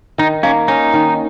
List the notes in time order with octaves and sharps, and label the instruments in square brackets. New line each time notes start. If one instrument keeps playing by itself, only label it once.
[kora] D#3 [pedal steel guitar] D#4
[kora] A#3 [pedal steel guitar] C#4
[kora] C#4 [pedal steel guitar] D#4
[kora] D#3